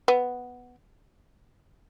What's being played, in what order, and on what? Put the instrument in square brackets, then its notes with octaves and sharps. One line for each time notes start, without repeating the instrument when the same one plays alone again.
[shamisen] B3